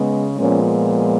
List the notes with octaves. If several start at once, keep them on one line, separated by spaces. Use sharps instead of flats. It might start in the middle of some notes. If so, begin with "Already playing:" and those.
Already playing: C#3 G#3 B3
A#2 F3 G#3 B3 C#4